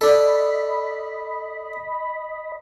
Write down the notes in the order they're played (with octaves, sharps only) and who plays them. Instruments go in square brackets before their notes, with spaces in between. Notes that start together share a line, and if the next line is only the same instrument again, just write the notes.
[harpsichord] D4 A4 [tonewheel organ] D#5 B5